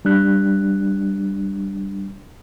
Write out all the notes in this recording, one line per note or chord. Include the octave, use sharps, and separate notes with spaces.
G3 D4 F#6